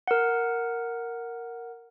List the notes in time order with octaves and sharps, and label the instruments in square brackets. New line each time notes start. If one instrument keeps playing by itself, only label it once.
[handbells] A#4 F#5